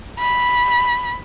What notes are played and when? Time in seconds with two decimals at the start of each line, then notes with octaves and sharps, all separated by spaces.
0.20 B5